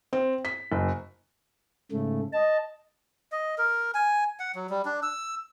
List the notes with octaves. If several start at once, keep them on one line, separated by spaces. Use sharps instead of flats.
C4
B6
F#1
G#2 C#3 A3
D#5 A5
D#5
A#4
G#5
F#5
F#3
G3
D4
E6